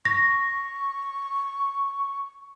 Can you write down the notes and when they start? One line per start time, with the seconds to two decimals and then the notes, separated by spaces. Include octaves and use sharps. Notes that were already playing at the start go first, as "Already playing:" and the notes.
0.05 C#6 A#6